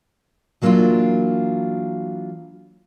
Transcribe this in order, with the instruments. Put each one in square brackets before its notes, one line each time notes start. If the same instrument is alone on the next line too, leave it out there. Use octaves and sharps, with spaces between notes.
[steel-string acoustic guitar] E3 F#3 A#3 B3 D4 F4